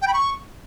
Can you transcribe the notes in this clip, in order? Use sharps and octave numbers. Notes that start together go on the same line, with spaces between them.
G5
B5
C#6